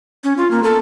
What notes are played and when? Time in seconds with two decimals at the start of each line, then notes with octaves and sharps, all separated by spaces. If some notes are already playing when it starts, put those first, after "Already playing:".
0.24 C#4
0.37 F4
0.51 A#3
0.63 A4